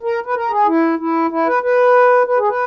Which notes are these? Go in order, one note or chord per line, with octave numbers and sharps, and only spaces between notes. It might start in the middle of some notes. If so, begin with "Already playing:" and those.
A#4
B4
A#4
G#4
E4
E4
E4
B4
B4
B4
G#4
B4